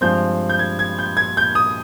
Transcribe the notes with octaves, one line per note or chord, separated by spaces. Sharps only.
G2 F3 G#3 C4 G6
G6
G#6
G#6
G6
G#6
G6
D#6